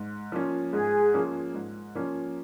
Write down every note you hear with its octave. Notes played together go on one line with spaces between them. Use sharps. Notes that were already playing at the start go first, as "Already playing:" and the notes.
Already playing: G#2
F3 A#3 C#4
G#2 G#4
F3 A#3 C#4
G#2
F3 A#3 C#4